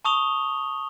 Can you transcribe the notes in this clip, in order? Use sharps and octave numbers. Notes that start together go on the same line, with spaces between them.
A5 C#6 D#6 F7 G7